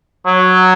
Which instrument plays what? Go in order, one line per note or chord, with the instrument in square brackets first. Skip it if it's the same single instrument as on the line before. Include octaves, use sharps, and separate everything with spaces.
[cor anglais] F#3